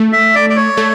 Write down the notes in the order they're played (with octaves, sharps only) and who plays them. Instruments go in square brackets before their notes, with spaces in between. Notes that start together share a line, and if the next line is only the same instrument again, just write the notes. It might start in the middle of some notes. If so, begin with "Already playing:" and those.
Already playing: [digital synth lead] A3
[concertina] E5
D5
D5
C#5
[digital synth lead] A3